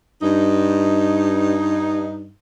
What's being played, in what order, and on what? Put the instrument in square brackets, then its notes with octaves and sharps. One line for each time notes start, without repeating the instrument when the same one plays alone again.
[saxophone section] G2 D#4